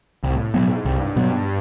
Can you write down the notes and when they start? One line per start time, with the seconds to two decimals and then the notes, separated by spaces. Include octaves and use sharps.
0.23 C2 A2
0.54 G#2 B2 F#3 B3
0.85 C2 G2
1.16 G2 B2 F#3 B3